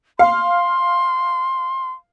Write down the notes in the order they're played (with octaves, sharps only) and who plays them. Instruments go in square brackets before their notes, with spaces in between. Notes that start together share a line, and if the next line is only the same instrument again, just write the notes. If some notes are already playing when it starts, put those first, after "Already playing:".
[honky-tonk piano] F5 [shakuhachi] C6